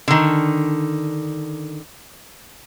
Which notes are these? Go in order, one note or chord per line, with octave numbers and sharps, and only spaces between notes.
D3 D#3